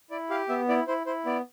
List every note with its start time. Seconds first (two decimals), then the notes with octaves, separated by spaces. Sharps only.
0.11 E4 D5
0.30 G4 F5
0.49 B3 E5
0.69 E4 D5
0.88 E4 C5
1.06 E4 C5
1.26 B3 D5